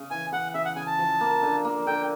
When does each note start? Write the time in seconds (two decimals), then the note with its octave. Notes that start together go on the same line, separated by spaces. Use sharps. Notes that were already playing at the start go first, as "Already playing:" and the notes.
Already playing: C#3
0.11 E3 G#5
0.32 C#3 F#5
0.54 C#3 E5
0.65 F#5
0.76 C#3 G#5
0.87 A5
0.99 F3
1.21 A#3
1.43 D3
1.65 A#3
1.87 D3 G5